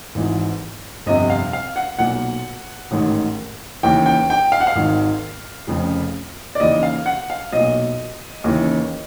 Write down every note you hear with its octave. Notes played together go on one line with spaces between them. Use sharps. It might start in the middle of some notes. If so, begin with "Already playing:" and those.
G#1 G#2 E3
G1 F2 C3 D#5
F5
F5
F#5
B1 A#2 F#5
A1 G#2 D#3
D#2 C#3 E3 G5
G5
G5
F5
F#5
F5
G#1 G#2 D#3
F1 F2 C#3
D5
D#2 C#3 E3 D#5
F5
F#5
F5
B1 A#2 D#5
D#2 C#3 E3